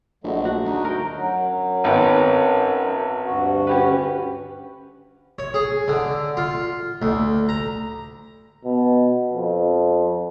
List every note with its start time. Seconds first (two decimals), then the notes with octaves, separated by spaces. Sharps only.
0.24 A#1 F#3 G#3 A3
0.45 F#4
0.65 D2 D#4
0.85 A#4 G5
1.12 F#2 F#3
1.84 G#1 B3 G5
3.22 D2 G2 F#4
3.67 C#4 G4 B4
5.39 C#5
5.54 G#4
5.88 D3
6.37 F4
7.02 D2
7.49 A#5
8.65 B2
9.33 F2